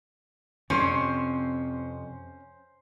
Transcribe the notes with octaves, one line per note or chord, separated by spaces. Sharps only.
F2 C3 C#4 C5 C6